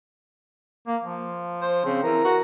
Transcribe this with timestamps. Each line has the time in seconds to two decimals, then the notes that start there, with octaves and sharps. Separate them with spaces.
0.87 A#3
1.02 F3
1.62 C5
1.85 C#3 C4
2.03 E3 A#4
2.24 F#4